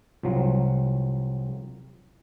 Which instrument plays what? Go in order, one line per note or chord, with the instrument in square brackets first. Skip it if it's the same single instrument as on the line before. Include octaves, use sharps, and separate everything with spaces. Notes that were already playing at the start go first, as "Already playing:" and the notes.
[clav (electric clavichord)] C2 F3 F#3